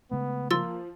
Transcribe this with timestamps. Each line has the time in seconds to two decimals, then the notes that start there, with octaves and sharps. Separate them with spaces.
0.11 C#3 G#3 A3 B3
0.51 F3 A#3 C6 E6 A6